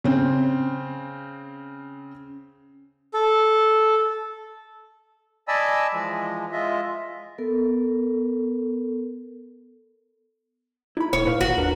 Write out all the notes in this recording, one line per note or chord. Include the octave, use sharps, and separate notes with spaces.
C#3 C4
A4
D5 D#5 G#5 A5 B5 E6
E3 F3 G#3
G#3 F4 D#5 E5
B3 A4 A#4
D#4 E4 B5
D1 C#5
A#2 B4 F5
G#1 F#4
E2 D4 A#4